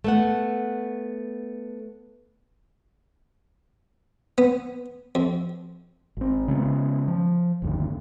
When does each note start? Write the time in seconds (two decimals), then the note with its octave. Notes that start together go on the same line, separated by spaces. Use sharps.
0.04 A3 B3 F#5
4.38 B3
5.15 F2
6.17 G#1 C4
6.48 C#3 G#3 A3 B3
7.08 F3
7.62 G1 D#2 D3